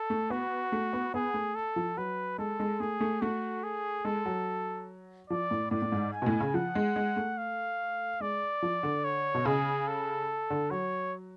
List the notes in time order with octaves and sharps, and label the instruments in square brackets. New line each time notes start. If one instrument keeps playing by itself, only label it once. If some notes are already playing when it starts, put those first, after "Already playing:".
Already playing: [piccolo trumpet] A4
[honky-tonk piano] A3
[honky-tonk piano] B3 [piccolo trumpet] F#4
[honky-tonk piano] A3
B3
[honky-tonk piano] B3 [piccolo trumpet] G#4
[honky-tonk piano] A3
[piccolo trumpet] A4
[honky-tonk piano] F3
[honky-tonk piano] F#3 [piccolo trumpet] B4
[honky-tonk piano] G#3 [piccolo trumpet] A4
[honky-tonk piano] G#3
[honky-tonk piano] A3 [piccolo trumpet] G#4
[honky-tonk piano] A3
[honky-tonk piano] A3 [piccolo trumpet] F#4
[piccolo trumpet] G#4
[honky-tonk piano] G#3 [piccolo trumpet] A4
[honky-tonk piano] F#3
[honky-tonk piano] F3 [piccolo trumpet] D5
[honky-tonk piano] A2
[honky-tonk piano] A2 [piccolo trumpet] D5
[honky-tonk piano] A2
G#2
[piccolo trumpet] G#5
[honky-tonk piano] B2
A2
C#3
[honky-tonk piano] F3 [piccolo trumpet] F#5
[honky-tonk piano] G#3
G#3
A3
[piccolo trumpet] F5
[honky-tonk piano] G#3 [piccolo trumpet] D5
[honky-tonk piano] F3
D3
[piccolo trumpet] C#5
[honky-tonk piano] B2
[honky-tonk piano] C#3 [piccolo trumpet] G#4
[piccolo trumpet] A4
[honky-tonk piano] D3
[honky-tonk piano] F#3 [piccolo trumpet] C#5